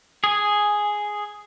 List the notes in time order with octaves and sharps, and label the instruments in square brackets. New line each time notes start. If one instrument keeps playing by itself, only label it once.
[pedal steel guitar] G#4 G#5